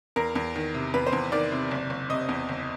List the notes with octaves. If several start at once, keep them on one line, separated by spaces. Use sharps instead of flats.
E2 A#4
E2
D#3
C3
E2 B4
C5
E2
D#3 D5
C3
F#1
F#1
C3 D#5
E2
F#1